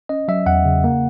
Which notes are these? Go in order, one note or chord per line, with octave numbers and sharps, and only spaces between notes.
C#4 D#5
F#3 E5
E2 F#5
C#3
A#3